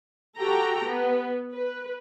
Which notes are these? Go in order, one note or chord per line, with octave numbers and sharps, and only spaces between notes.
F#4 G4 A4 G5 A#5
B3
B4